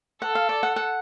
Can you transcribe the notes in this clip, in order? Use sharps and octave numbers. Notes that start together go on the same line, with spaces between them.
A4 F#5
F5
D5
F#5
F#5